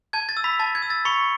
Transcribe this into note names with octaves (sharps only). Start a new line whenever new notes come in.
A5 G#6
A6
E6
B5 B6
A5 A6
G#6
E6
A6
B5 C#6 C#7